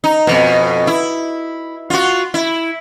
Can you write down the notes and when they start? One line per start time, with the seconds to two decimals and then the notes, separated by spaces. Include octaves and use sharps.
0.04 D#4
0.27 F2 B2
0.87 E4
1.90 F4 F#4
2.34 E4